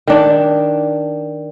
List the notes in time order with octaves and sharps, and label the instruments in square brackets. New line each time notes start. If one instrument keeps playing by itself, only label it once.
[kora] D#3 D4